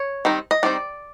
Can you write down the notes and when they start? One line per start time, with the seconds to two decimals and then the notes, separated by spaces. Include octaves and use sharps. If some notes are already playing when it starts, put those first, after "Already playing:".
Already playing: C#5
0.25 D#3 G3 C4 D#4
0.51 D#5
0.63 D#3 G3 C4 D#4 D5